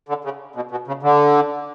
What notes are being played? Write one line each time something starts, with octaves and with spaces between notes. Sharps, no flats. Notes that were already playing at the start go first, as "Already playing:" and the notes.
D3
C#3
B2
B2
C#3
D3